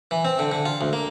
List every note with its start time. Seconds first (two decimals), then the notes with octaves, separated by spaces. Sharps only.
0.11 E3
0.25 C4
0.39 D3
0.52 D3
0.65 F4
0.81 D2
0.93 A#3